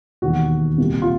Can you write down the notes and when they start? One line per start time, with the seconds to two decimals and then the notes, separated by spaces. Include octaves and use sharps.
0.22 E1 D#2 D#3 F#4
0.78 C2 A#2 G3
1.02 F4